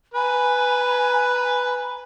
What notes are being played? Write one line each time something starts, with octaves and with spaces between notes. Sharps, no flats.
B4 G#5 A#5 B5